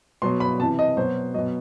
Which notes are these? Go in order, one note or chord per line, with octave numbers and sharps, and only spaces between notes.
B2 F#3 C6
B5
C3 E3 A5
D#5
B2 F#3 C5
B2 F#3 D#5